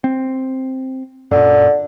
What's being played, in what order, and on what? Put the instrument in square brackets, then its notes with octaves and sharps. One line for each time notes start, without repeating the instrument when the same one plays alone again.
[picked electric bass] C4
[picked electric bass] F#2 A#2 [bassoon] D3